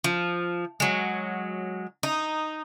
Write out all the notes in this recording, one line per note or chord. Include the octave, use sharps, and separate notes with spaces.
F3
F#3 G#3
D#4